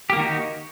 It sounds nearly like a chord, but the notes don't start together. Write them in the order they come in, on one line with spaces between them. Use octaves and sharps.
G4 A#3 D#3 F#4 D#4